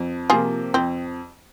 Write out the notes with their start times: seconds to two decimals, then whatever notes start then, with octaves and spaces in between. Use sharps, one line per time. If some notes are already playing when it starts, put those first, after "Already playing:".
Already playing: F2
0.30 C3 F3 A#3 F4 G#4
0.74 F2 C4